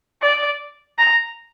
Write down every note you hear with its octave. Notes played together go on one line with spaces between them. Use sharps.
D5
A#5